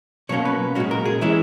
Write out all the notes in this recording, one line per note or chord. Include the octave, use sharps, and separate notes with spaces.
B2 F#3 A#3 C#4 C#5
B4
A#2 G#3 C#4 F#4
A#4
G#4
E3 G#3 C#4 E4